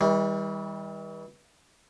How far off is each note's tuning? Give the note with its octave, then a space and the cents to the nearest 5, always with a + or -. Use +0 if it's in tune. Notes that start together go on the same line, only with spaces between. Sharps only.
E3 -40 G3 +25